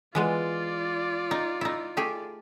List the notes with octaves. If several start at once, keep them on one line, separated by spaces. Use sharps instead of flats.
E3 G#3 B3 F4 D5
D#4
D#4 E4
A3 G4 G#4